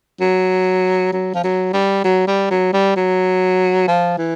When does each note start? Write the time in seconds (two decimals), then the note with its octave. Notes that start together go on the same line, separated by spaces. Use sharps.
0.21 F#3
1.13 F#3
1.35 F3
1.44 F#3
1.73 G3
2.04 F#3
2.27 G3
2.51 F#3
2.73 G3
2.96 F#3
3.88 F3
4.18 E3